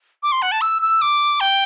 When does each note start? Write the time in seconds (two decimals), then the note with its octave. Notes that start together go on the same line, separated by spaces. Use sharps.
0.23 D6
0.32 C6
0.42 F#5
0.52 A5
0.61 E6
0.82 E6
1.02 D6
1.40 G5